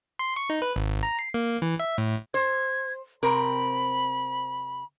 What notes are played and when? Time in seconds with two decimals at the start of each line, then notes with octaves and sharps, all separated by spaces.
0.19 C6
0.36 C#6
0.50 D#4
0.62 B4
0.76 G#1
1.03 A#5
1.19 C7
1.34 A#3
1.62 E3
1.80 E5
1.98 A2
2.34 C5 G#6
3.23 C3 C4 A#4 B5